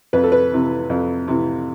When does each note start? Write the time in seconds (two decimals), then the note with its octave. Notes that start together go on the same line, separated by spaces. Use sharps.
0.13 F2 B4
0.24 A4
0.32 B4
0.52 C3 E3
0.90 F2
1.28 C3 E3